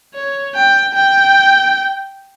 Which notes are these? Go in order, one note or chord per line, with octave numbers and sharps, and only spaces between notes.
C#5
G5
G5